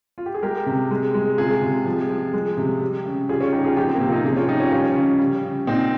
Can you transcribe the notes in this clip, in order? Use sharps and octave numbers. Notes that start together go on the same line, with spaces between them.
F4
G4
G#4
G#3 G4 A#4
C3
G#3
G#3
C3 F4 G#4
C3
F3
F3
G#3
C3
G3
C#3
G3 F4 G#4
C#4 F4
G3 D#4 G4
F4 G#4
F3 D#4 G4
C4
A#3
C3 C4
F4
D#4 G4
C3 F4 G#4
C#4 F4
F3 D#4 G4
C#4 F4
G3 C#4 F4
C#3
G3
C#3
A#2 C4 D#4